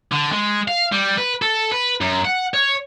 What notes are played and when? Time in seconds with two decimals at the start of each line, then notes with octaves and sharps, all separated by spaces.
0.12 D3
0.32 G#3
0.68 F5
0.92 G3
1.18 B4
1.42 A4
1.72 B4
2.01 F#2
2.25 F#5
2.54 C#5